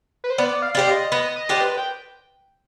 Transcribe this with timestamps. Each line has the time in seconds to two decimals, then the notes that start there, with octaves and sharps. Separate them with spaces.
0.24 B4
0.30 C5
0.38 B3 D5
0.62 F5
0.75 D4 G4 C5
0.88 D#5
1.12 B3 D#5
1.36 D#5
1.49 D4 G4 C5
1.61 B4
1.77 G5